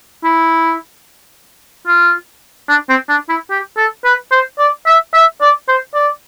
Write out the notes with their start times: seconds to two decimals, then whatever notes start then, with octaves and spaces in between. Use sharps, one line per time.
0.24 E4
1.87 F4
2.69 D4
2.89 C4
3.09 D4
3.29 E4
3.50 G4
3.77 A4
4.05 B4
4.32 C5
4.59 D5
4.87 E5
5.14 E5
5.41 D5
5.68 C5
5.95 D5